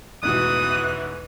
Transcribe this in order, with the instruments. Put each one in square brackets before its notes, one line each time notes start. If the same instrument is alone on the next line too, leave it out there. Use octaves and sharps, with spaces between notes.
[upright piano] A1 G#2 B2 [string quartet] E2 E3 [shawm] D#6 [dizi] F#6